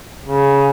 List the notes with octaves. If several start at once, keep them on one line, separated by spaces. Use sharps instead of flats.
C#3